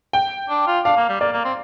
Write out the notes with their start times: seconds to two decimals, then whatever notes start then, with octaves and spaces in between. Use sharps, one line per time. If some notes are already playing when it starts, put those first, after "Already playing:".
0.13 G5
0.50 D4
0.67 F4
0.85 D4 F5
0.97 A#3
1.09 G3
1.20 A#3 D5
1.33 A#3
1.45 C4